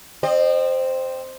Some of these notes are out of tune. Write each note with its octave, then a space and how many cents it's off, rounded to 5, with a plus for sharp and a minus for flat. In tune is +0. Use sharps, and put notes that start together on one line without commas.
C4 +0 D#5 -35